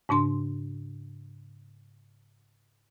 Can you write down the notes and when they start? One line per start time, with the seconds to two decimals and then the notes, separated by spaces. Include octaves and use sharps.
0.09 G#2 C#3 D4 C6